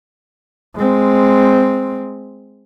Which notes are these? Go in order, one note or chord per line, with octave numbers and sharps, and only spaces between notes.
G#3 C4